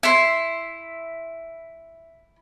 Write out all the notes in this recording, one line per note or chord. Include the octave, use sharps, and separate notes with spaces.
E4 C6